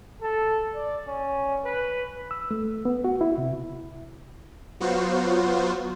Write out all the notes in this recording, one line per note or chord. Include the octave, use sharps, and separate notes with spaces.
A4
D5
C#4
B4
E6
A3
B3
F#4
E4
C3
F#3 B3 F4 F#4 C5